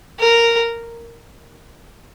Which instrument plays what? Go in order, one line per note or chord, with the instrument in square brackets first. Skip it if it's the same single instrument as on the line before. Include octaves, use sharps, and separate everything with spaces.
[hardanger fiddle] A#4